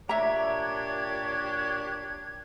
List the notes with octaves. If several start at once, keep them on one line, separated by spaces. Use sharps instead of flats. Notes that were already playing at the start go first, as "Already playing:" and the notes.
A#2 D4 G4 C#5 E5 A#5 G#6